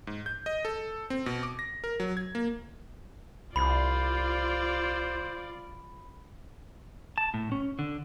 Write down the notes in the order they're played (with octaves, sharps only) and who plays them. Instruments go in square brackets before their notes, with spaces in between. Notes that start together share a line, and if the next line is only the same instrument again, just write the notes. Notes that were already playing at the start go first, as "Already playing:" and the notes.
[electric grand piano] G#2
G6
D#5
A4
C4
B2
D6
A#6
A#4
F#3
G#6
A#3
[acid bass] C2 [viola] F4 D5 [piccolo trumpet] C5 [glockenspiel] B5
[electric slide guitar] A5
A2
C#4
D3